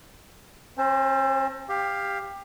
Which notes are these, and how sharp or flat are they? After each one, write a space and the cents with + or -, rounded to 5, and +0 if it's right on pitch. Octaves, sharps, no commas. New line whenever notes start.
C#4 -45 C5 +0 A5 +0
G4 +20 F5 +0